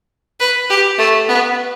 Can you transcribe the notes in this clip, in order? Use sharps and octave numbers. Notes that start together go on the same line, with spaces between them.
B4
G4
A3
B3